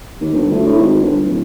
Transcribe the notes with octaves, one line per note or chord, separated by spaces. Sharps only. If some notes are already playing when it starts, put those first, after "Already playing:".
D#2
G1
D2
A2
G#1
G1
D1